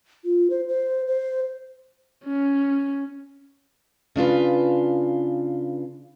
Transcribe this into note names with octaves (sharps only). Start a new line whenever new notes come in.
F4
C5
C5
C5
C#4
C#3 D4 F4 B4